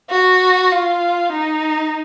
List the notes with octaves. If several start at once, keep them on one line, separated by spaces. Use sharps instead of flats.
F#4
F4
D#4